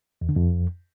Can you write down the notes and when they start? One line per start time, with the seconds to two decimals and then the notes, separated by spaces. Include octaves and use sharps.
0.21 E2
0.29 D3
0.36 F2